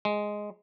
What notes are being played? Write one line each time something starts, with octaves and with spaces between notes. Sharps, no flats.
G#3